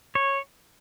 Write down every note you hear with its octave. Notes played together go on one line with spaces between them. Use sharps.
C#5